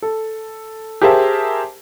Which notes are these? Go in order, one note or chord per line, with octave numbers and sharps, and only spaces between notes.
A4
G4 G#4 A#4 C5 E5 A5